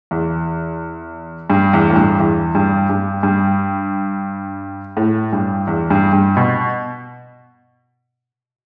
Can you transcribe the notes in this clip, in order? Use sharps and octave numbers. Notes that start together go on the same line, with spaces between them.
E2
G2
E2
A2
G2
E2
G2
G2
G2
A2
G2
E2
G2
G2
B2